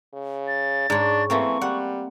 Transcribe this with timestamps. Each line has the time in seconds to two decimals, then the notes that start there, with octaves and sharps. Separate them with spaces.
0.13 C#3
0.48 A6
0.90 G#2 D4 C#5
1.30 E3 A3 A#3 C4 C#6
1.62 G3 F#5